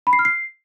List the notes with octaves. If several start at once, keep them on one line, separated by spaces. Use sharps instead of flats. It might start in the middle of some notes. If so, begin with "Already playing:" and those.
B5
C7
F6
C7